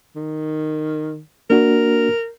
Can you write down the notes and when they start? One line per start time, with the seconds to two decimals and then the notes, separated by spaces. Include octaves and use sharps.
0.16 D#3
1.50 A#3 D4 F#4 A#4